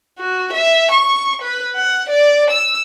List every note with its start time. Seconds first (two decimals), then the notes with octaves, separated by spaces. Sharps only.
0.18 F#4
0.53 E5
0.91 C#6
1.42 B4
1.75 F#5
2.09 D5
2.50 E6